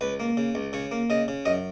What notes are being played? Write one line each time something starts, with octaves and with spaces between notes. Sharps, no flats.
C#2 B4
A#3
C#3
C#2
C#3 C#5
A#3
C#3 D#5
C#3
F#2 D#5